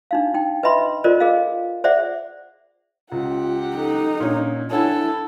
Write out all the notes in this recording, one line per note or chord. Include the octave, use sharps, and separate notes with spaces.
D4 D#4 F5
D#4 G5
B4 D#5 E5 B5 C6
F4 A4 A#4 C5 D5 D#5
G#4 A#4 D#5 F5
G#4 C5 D5 E5 F#5
C#2 F4 G4 F#5
D#4 A4
A#2 C#4 D4
D4 E4 A4 C#5 F#5 G#5